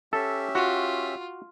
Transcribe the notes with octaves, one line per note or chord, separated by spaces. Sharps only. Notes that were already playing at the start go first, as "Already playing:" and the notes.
C#4 G4 A4 E5
F4 F#4